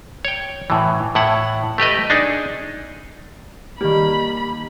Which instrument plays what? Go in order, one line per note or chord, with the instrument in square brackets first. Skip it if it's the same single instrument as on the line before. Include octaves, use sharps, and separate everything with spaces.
[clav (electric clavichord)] C#5 G5
A2 E3
A2 E4 F#5
A3 G4 B4 D#5
D4 D#4 G#4
[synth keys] D#3 A#3 [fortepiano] G3 [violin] B5